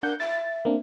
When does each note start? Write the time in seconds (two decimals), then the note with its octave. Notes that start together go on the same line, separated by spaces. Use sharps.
0.03 D4 A#4 F#5 G6
0.20 E5 A6
0.65 A#3 C4 D4